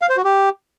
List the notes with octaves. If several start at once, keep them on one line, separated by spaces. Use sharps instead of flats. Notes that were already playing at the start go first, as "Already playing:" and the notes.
F5
C5
F#4
G4